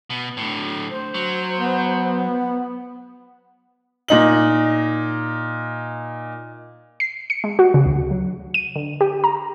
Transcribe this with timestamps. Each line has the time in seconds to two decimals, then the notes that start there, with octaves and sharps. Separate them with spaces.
0.10 B2
0.37 A2 D3
0.90 C5
1.14 F#3
1.59 B3
4.08 A#2 D#4 F#7
7.00 C7
7.30 C#7
7.44 G#3
7.59 F#4
7.74 C#3
7.86 D2
8.11 F#3
8.54 D#7
8.76 D3
9.01 G4
9.24 A#5